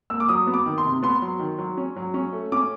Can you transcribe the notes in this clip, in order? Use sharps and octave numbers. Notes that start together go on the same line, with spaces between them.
A#3 E6
D6
F#3 D#6
B3
D6
D#3
C6
C3
B3 C6
F#3
D#3
F#3
C#4
F#3
C#4
A3
C#4 D6